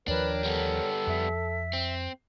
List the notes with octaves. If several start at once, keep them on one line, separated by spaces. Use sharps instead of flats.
D#2 F3 D4 A#4 B4 C#5 G5
G3 B3 A4
F2 E5
C4